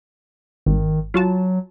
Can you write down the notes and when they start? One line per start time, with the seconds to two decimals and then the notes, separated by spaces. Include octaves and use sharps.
0.66 G#1 D#3
1.14 F#3 F4 F#4 A5